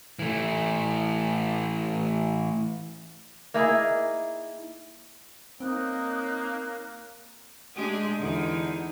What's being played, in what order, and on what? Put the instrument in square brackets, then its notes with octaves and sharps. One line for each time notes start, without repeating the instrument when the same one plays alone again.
[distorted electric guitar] E3 A3
[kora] A#3 D#4 E4 G#4
[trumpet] A#3 [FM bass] C4 [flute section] D#4 C#5 F#6
[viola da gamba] G#3 D4 G4
E2 D3 D#4